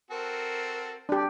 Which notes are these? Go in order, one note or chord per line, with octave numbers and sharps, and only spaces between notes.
C4 F#4 A4 A#4
D4 G4 D5